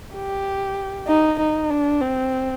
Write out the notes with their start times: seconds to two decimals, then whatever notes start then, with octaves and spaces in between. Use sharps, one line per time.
0.15 G4
1.08 D#4
1.39 D#4
1.70 D4
2.01 C4